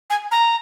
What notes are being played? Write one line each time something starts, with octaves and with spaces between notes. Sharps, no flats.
G#5
A#5